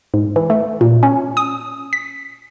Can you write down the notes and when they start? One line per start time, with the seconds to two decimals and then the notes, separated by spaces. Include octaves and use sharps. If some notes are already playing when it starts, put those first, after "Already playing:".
0.14 G#2
0.36 E3
0.50 A3
0.81 A#2
1.03 C#4
1.37 D#6
1.93 B6